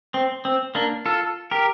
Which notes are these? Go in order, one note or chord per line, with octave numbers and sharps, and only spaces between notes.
C4
C4
A#3 D4
F4 A4
G4 A#4